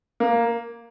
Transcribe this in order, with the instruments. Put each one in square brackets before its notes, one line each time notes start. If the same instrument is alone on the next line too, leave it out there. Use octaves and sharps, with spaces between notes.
[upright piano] A#3